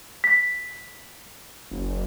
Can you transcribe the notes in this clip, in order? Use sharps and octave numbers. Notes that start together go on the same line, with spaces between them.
B6
F#1